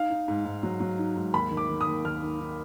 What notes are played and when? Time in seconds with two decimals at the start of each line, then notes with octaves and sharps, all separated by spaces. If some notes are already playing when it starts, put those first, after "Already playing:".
Already playing: D#4 F5
0.11 D#4
0.28 G#2
0.45 G#2
0.63 F#3
0.80 F#3
0.99 D#4
1.16 G#2
1.33 D#2 B5
1.51 D#3
1.57 D6
1.69 D#3
1.81 D#6
1.87 D#2
2.05 D#2 F6
2.22 D#3
2.40 D#4